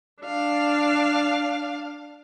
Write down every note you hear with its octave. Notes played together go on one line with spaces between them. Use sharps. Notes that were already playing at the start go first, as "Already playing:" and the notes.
D4 F5